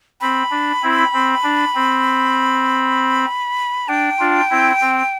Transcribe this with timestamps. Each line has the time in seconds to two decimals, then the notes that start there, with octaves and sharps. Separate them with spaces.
0.21 C4 B5
0.51 D4
0.83 C4 E4
1.13 C4
1.44 D4
1.75 C4
3.88 D4 G5
4.19 D4 F4
4.50 C4 E4
4.81 C4